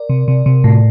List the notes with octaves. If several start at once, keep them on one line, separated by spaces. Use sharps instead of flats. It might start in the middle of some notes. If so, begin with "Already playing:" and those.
Already playing: A#4 D5
C3
C3
C3
A2